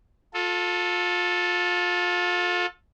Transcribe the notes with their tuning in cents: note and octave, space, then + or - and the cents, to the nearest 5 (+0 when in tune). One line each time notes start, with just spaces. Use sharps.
F4 +30 A4 +0